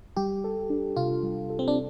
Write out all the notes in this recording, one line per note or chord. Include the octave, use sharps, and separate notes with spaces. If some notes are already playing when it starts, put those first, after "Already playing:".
G3 G4
A4
D4
C3 F4
G3
A4
C4
D4